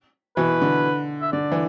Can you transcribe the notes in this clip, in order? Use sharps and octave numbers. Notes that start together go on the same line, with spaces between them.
B2 E3 B4
D3
E5
D3 D5
E3